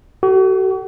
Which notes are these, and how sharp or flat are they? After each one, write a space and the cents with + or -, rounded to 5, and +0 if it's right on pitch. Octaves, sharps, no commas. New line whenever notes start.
F#4 +40 A4 +10